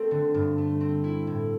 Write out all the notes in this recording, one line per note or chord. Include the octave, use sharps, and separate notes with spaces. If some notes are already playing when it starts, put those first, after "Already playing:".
Already playing: A3 C4
D3
G2
A3
C4
E4
A2